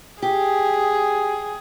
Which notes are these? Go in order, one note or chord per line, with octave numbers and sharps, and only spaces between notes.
G4 G#4